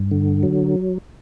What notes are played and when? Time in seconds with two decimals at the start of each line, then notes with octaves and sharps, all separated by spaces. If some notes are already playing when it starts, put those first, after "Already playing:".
Already playing: G2
0.11 D3
0.43 F#3